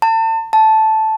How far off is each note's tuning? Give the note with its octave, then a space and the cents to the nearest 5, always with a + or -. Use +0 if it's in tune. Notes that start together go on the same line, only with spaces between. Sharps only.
A5 +35
A5 -5